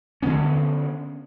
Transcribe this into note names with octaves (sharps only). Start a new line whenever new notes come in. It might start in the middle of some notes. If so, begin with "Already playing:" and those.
D3 F3 B3 C#4